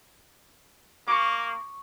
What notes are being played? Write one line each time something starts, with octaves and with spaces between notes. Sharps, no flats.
A#3 C#6 D6